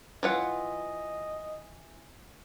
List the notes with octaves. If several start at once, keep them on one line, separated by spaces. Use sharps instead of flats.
E3 F4 D#5 F#5